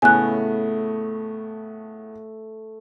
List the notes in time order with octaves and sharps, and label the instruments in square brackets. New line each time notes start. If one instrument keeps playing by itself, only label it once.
[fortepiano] A2 C#3 B3 [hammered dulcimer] A3 [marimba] G#5 F#6